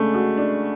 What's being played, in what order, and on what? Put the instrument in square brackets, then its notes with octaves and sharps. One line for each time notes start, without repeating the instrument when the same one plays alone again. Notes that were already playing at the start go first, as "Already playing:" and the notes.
Already playing: [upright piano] C#3 G#3 D4 [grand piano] A3
[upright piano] F#4
D4